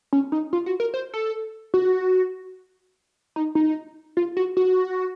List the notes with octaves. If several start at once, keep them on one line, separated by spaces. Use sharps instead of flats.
C#4
D#4
F4
F#4
A#4
C5
A4
F#4
D#4
D#4
F4
F#4
F#4